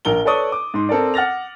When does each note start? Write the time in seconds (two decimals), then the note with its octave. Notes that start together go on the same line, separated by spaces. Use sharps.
0.05 A#1 A#4 G7
0.25 A4 B4 C#5 D5 C#6 D#6
0.52 D6
0.74 G#2 C6
0.89 C4 A4 A#4 D5
1.14 F#5 F6 A6 A#6 F7